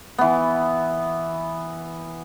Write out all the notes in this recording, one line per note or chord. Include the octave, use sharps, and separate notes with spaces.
E3 B3